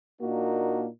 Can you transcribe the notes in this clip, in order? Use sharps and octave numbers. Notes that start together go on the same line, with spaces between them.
A#2 A#3 D4 D#4 F#4